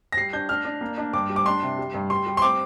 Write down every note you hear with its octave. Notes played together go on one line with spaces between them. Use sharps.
A#6
G3 C7
D4 G6
D4 F6
D4
A#3
D4
G2 D6
G3
D6
D4 C6
C3
G3
G2
G3 C6
G3
C6
C4 D6